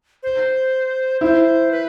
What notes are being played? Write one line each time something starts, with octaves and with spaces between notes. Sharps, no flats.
C5
E4 C5
B4